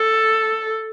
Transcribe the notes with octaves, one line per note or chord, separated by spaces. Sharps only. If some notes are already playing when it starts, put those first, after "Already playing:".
Already playing: A4